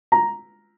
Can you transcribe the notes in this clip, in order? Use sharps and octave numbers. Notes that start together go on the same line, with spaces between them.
A#5